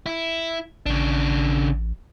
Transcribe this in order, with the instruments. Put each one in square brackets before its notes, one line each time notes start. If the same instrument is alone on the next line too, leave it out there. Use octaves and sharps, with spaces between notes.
[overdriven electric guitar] E4
[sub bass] A1 [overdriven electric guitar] C#3 D4